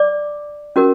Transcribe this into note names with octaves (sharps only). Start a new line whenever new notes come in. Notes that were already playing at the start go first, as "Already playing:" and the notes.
Already playing: D5 D6
C#4 F#4 A#4